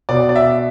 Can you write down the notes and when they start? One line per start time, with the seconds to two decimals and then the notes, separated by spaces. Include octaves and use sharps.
0.09 B2 D5
0.29 D5
0.36 E5